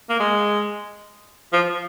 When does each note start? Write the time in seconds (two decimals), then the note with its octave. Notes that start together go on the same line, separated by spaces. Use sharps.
0.09 A#3
0.20 G#3
1.53 F3